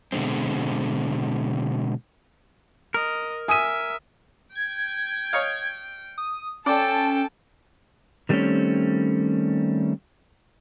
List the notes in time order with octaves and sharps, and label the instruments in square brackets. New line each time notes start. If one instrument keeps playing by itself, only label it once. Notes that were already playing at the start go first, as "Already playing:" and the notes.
[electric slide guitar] B2 D3 G#3 C4
[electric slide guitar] A#4 [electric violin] D#5
[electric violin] E5 [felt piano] G#5 [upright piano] D#6 D#7
[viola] G5 [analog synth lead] G#6
[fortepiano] C#5 D#5 F5
[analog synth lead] D#6
[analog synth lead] C#4 [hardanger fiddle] A4 G5 [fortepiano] D5 [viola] A5
[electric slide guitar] D#3 G3 A3 A#3 C4 C#4